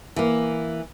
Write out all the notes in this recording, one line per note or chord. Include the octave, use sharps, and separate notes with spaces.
E3 A#3